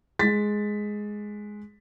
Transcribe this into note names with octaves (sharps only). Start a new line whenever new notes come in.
G#3 A6 B6